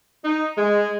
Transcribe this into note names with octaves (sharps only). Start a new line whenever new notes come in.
D#4
G#3